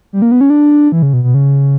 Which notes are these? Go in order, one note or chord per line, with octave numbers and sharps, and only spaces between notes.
G3
A#3
B3
C#4
D4
E3
C#3
B2
B2
C#3